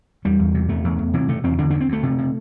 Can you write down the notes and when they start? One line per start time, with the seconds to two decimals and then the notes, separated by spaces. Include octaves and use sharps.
0.25 E2 G3
0.39 E2
0.54 C3
0.69 E2 A3
0.84 E2
0.99 E2
1.14 C3 E3
1.28 C3 A3
1.44 E2 C4
1.59 D3 D4
1.70 D2 D4
1.81 C4
1.88 D2 A3
2.03 C3
2.18 C3